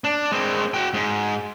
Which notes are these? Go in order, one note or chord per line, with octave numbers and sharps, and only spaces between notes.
D4
G#3 C4
F#4 G5
G#2